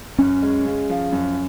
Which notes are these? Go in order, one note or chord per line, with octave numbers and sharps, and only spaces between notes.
F#2 C#4
G#3
C#3
F3
F#2